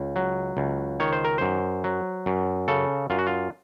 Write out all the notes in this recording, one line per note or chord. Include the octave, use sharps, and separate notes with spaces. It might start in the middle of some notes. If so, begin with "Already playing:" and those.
Already playing: C#2
F#3
C#2
D#3 C#5
C5
A#4
F#2 C5
F#3
F#2
C#3 A4
F#2 F4
F#4
F4